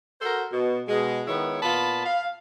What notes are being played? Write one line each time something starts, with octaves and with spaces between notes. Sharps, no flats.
F#4 A4 A#4 C5
B2
B2 G#3
D#3 G#3 B3 E4 C#5
A#2 B3 F4 A5 B5
F5